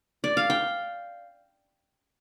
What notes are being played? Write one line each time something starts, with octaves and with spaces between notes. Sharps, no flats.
D5
F5
G5